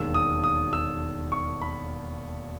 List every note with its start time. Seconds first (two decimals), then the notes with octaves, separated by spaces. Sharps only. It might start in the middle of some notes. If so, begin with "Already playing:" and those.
Already playing: E1 D#2 D#3 E6
0.14 D#6
0.44 D#6
0.73 E6
1.32 C#6
1.62 B5